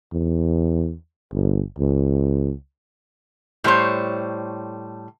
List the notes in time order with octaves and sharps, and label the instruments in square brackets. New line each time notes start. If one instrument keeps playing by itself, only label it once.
[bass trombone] E2
G1
C#2
[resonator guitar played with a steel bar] A2 G3 C5 C#5